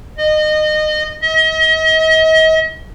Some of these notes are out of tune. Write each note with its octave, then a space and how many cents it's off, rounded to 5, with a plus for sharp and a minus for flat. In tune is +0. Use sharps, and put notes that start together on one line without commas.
D#5 -25
D#5 +40